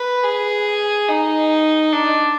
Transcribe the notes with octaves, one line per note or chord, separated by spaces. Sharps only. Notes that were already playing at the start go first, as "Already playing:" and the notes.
Already playing: B4
G#4
D#4
D4